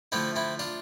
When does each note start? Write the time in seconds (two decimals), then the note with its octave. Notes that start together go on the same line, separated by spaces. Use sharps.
0.12 D3 F3 A3 C4 E4
0.36 C4 E4
0.59 D4 F4